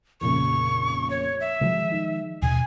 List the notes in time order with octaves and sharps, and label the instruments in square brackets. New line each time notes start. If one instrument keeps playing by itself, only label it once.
[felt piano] F1 A#2 C#3 [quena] C#6
[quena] C#5
E5
[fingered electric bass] D#3 F3 G#3 [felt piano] F#3
[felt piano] D#4
[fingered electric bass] D#2 B2 [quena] G#5